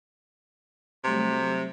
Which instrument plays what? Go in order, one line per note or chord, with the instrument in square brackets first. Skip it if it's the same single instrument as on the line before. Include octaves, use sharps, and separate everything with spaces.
[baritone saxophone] C3 [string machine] F#3 G3 A3